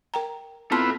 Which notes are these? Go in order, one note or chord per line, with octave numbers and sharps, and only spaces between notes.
A#4 G5 A#5
B3 C4 E4 F4 A4 A5 B5 C6